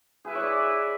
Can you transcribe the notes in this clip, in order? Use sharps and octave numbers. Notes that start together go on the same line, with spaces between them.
E4 G#4 B4 E5
C#5
D5